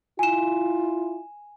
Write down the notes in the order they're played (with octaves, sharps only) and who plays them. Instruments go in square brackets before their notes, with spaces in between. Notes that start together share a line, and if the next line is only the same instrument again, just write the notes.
[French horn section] E4 F4 [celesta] G#5 E7